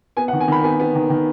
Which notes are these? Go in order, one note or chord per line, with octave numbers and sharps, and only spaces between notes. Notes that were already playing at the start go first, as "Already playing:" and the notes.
B3 G#5
F#5
D#3
G#5
D#3 B5
B3 G#5
B3
D#3
D#3